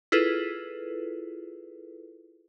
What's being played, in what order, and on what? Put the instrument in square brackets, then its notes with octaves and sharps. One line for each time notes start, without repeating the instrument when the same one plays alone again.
[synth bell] E4 F4 G#4 A4 B4